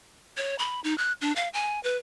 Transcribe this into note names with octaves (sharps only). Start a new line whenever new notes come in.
C#5
B5
D#4
F#6
D4
F5
G#5
B4